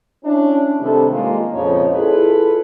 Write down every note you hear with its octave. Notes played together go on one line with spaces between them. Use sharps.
C#4 D4 E4
C3 D#3 G3 A3 A4
G#3 A#3 F4
F2 A#2 C#3 F3 D#4 C#5
E4 F4 G#4 A4 B4